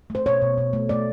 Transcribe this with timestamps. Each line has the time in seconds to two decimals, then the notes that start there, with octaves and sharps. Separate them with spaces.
0.10 A3 C5
0.26 B2 C#5
0.42 B2
0.58 B2
0.73 A3
0.89 A3 D5